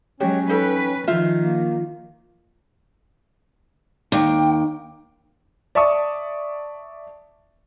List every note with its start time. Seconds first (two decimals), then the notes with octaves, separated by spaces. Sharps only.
0.20 F#3 G#3 C#4 F#4 G4 C#5
0.49 D#4 A4 B4 G5
1.07 D#3 F3 F4 C5 E5
1.40 A#3
4.12 D#2 G5
5.75 D5 E5 A5 C#6 D#6